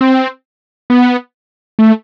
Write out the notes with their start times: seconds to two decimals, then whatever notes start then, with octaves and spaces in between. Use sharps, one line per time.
0.01 C4
0.90 B3
1.79 A3